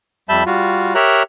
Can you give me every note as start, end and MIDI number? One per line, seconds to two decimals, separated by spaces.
0.29 0.44 41
0.29 0.44 55
0.29 0.44 76
0.29 0.44 81
0.29 0.44 83
0.29 0.44 91
0.46 0.94 55
0.46 0.94 65
0.46 0.94 66
0.95 1.23 67
0.95 1.23 70
0.95 1.23 73
0.95 1.23 76
0.95 1.23 82
0.95 1.23 90